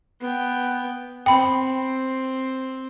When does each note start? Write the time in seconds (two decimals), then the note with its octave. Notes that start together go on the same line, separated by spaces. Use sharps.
0.21 B3 G5
1.26 C4 G5 B5